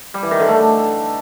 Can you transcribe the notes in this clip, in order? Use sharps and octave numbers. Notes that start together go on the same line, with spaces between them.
G3
E3
D#3
D3
A3